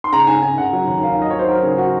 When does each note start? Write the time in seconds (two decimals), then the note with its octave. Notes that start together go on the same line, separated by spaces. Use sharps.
0.04 C6
0.13 C#3 A#5
0.27 C#3 G#5
0.42 C#3 G#5
0.58 C#3 F#5
0.73 F#3
0.88 D#2
1.03 D#2 F5
1.13 F5
1.19 F#3 D#5
1.30 F#3 C#5
1.39 C5
1.48 F#3 A#4
1.63 C#3 G#4
1.78 F#4